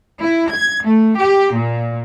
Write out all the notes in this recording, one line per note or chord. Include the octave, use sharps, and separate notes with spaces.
E4
G#6
A3
G4
A#2